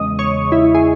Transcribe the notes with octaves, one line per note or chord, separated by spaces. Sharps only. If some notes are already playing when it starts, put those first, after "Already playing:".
Already playing: E2 C#3 G#3 D#5 D#6
C#5 C#6
E4 E5
G#4